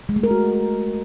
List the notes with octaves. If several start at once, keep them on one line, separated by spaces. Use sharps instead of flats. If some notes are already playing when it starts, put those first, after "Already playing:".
G#3
A3
A#4
F#4